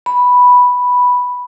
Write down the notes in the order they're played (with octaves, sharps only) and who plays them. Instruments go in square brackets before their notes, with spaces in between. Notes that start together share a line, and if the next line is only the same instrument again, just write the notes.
[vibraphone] B5